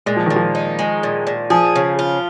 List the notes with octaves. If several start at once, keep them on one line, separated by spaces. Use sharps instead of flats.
A#2 G#3
F3
A#2 D#3
F3
D#4
G#3
A#2
A#2
F3 G#4
C#3
F4